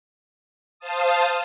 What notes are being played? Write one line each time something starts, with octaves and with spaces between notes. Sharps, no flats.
C5 F5 A5 D#6